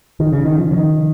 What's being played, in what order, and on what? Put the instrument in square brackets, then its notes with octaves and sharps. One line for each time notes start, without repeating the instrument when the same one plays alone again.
[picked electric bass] D#3
C#3
D#3
F3
C#3
D#3